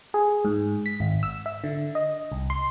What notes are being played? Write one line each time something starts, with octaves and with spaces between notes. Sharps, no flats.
G#4
G#2
B6
G#1
E6
E5
D3
D#5
C2
C6